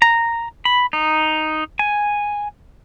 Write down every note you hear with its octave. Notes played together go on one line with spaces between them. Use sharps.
A#5
B5
D#4
G#5